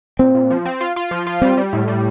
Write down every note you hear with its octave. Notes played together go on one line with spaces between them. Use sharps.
A#2 C4
A#2
F3
C4
F4
F4
F3
F4
G3 C4
G3
A2
G3